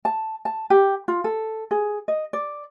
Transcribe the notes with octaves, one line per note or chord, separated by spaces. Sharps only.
A5
A5
G4
F4
A4
G#4
D#5
D5